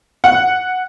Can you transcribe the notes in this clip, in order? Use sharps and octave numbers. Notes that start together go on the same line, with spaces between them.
F#5